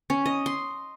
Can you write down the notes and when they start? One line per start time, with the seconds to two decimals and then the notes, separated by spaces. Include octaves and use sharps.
0.10 C#4
0.26 D#5
0.46 C6